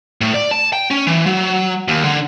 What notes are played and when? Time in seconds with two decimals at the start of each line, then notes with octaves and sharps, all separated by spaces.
0.21 A2
0.34 D5
0.51 A5
0.73 G5
0.91 C#4
1.07 E3
1.26 F#3
1.88 D#2
2.05 D3